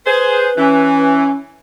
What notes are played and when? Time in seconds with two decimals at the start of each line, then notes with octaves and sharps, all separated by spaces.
0.06 G#4 B4 C5
0.58 E3 C#4